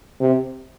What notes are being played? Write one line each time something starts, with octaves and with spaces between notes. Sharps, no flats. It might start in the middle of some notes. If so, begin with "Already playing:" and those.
C3